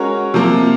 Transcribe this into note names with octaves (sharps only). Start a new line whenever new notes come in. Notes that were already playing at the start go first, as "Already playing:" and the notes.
Already playing: G#3 C#4 F#4 A#4 C#5
C3 F3 A#3